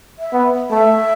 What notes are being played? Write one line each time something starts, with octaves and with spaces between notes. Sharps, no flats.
E5
B3
A3 E5